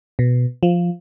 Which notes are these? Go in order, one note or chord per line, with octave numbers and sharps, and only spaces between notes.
B2
F3